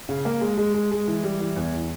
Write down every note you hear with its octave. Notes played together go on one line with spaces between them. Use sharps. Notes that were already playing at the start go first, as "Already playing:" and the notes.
C#3
A#3
G#3
G#3
G#3
G#3
E3
G3
E3
E2